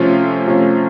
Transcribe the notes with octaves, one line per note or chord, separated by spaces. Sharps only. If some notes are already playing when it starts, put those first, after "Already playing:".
Already playing: C3 F3 A3 C#4 F4
C3 F3 A3 C#4 F4